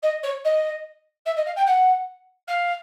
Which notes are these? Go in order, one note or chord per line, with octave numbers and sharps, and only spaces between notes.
D#5
C#5
D#5
E5
D#5
F5
G5
F#5
F5